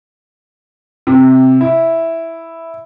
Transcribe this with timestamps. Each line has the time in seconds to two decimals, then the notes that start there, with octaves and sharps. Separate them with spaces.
1.07 C3
1.61 E4